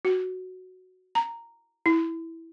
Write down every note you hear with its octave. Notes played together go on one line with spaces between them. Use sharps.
F#4
A#5
E4